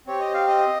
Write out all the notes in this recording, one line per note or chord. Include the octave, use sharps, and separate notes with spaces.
C4 G4 C#5
D#5
F5
D#5